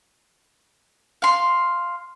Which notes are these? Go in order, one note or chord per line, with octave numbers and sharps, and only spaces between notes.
F5 C6